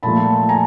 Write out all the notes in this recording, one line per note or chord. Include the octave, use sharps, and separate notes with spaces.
A#2 F3 A3 A5 B5
G#5 A#5